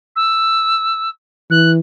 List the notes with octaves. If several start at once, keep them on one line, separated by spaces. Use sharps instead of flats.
E6
E3 F#6